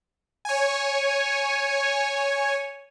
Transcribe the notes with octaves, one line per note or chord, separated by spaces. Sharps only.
C#5 G#5